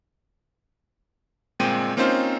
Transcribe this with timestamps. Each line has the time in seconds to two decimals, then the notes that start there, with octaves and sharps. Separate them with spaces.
1.60 G1 A#2 G#3 C4 G5 D#7
1.97 A#3 C4 C#4 D#4 F4 C5